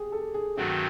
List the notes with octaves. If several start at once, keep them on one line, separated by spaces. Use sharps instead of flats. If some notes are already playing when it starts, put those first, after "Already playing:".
Already playing: G4 G#4
A4
G#4
G2 D#3 F#3 A3 C4 F#4